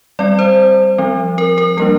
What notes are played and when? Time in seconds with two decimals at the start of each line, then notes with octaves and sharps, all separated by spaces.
0.19 G3 C4 D5
0.39 C5
0.98 F3 C4
1.38 A#4
1.58 A#4
1.77 G3 A#3 D4 A#4